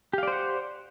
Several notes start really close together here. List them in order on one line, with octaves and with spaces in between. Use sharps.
G4 F5 D5 C5 F#5